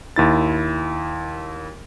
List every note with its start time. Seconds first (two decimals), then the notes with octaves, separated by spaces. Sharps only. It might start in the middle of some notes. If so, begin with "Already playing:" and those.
0.16 D#2 E4 A6